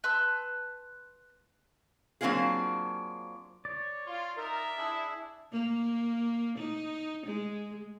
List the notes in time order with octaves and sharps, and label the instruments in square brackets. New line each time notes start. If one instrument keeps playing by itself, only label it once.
[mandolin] B4 A5 C6 E6
[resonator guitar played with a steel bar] F#3 A#3 C4 D4 F4 G#4
[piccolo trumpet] C#5 [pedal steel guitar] D5
[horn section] F4
[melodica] D#4 [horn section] A#4 [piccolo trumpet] E5
[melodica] D4 G#4 [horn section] E4
[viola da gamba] A#3
D#4
G#3